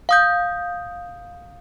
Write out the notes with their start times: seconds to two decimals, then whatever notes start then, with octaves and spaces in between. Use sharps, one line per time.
0.09 F5 D#6 G6